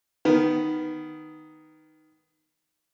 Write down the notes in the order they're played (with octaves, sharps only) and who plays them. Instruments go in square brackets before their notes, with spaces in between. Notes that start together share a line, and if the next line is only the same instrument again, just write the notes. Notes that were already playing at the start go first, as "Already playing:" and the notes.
[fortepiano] D#3 B3